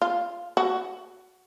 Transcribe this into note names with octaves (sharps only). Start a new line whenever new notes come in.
F4
F#4